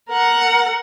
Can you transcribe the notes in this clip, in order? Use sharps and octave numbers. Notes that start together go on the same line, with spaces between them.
A#4 F#5